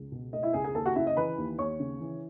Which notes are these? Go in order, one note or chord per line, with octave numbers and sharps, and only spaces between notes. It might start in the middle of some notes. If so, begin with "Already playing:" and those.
Already playing: C#2
B2
A3 D#5
E4 E5
C#2 G#4 G#5
G#4 G#5
D#2 A4 A5
F#4 F#5
C#3 E4 E5
D#5
E3 B4 B5
D#2
D#2 C#5 C#6
C#3
E3